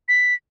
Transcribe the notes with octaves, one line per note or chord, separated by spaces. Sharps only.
B6